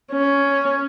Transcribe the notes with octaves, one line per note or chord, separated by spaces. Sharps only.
C#4